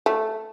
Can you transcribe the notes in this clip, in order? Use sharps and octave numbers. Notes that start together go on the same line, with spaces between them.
A3